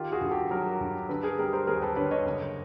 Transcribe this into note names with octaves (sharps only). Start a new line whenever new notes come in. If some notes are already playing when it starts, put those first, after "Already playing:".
Already playing: D#3 F4 G4
F#4 G#4
G2
G4 A4
F#3 G#4 A#4
G2
D3 A4 B4
G#4 A#4
G3 G#4 A#4
A#4 C5
D#2 G#4 A#4
A4 B4
D3 B4 C#5
C#5 D#5
F#1